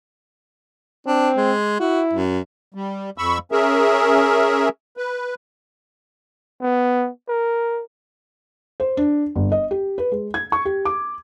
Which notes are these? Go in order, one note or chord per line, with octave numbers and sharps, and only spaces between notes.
C4 D4
G#3
E4 F#4
F#2
G3
F2 B5 C#6 E6
C#4 G#4 A#4 E5
B4
B3
A#4
C5
D4
G1
D#5
G4
B4
G#3
G#6
C#6
G4
D6